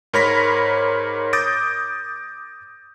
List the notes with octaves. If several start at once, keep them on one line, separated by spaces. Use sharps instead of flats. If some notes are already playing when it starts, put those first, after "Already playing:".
G#2 A#4 C#5 B5 A#6 B6
D6 D#6 G6 A6 A#6 D7